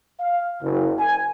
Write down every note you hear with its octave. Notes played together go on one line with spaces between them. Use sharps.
F5
F#1
G#5